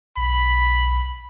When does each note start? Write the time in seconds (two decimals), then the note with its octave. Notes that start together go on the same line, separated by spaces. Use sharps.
0.17 B1 B5